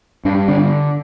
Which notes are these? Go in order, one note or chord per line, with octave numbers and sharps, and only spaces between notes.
G2 D4
D3 D4